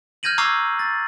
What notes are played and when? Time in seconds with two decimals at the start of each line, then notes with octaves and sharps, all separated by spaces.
0.23 F6 G6 G#6 A#6 D#7 F#7
0.38 A#5 C#6 D6 E6 G#6 C7
0.79 A6